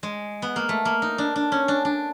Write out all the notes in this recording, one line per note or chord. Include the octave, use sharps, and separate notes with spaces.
G#3
B3
A#3
A3
A#3
D#4
D4
D4
C#4
D4
D4